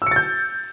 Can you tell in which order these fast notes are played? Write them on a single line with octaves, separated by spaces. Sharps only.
E6 C#7 A6 G6